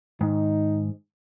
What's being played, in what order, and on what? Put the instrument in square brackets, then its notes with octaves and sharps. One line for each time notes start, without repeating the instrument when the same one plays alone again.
[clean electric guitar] G#2 D#3 [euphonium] D#4